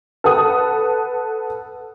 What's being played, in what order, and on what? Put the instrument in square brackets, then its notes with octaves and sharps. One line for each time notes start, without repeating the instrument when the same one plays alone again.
[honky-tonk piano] A4 B4 F#5 D#6